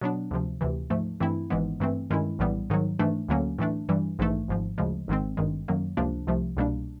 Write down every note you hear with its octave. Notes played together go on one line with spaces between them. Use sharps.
B2 F#3 B3 D4
D2 C3 F3
D2 C3 E3
G#2 F3 A3
G2 E3 A3 C4 E4
G#1 G#2 E3 G#3 B3
G2 E3 A3 C4
G2 D#3 G#3 C#4 E4
A#1 A2 E3 G3 B3
G#2 D#3 F#3
G#2 E3 A3 D4
D2 D3 F#3 A#3 C#4
A2 E3 A3 D4
G2 E3 G3
A#1 G#2 E3 A3
G#1 G#2 F3
D2 C#3 F3 G#3
G#1 G#2 D#3 G#3 C4
G#1 G2 D#3 G#3
F#2 D#3 F#3 A#3
C#2 C3 F3 A#3 D4
C2 C3 F3 A3
C2 B2 G3 A#3 D4